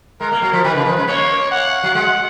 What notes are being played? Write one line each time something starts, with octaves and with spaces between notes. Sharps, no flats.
G#3 A#4
A#3
F#3
F3
D#3 B4
C#3
F3
G#3
A#3 C#5
F#5
F#3
G#3 F#5